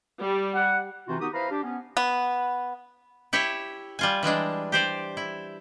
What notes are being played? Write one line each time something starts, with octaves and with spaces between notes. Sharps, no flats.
G3
F#5
C3 E3 C4 D#4 F4 F#4
D#3 B3 D#4 F#4 G4 D#6
E4 B4 C5 F5 A#5 B5
D4 G4
B3 C#4
B3
E4 G4 C#5 E5
G3 F4 G#5
E3 G3 G#3 D4
G4 C5 D5
E4